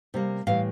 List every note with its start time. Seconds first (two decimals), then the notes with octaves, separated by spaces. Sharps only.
0.14 C3 G3 A#3
0.47 A2 E3 G3 F5